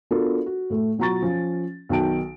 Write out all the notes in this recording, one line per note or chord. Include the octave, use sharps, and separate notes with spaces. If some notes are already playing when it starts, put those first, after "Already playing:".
B3 D4 F4 F#4 A4 A#4
F#4
A2 A3
B2 F#3 F4 A#5 C#6 A6
F3 C#4
B1 D#3 F#4 G5 A5 D7